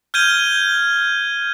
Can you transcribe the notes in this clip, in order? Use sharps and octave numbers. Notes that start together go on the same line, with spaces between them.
F6 G6 G#6 D#7 G7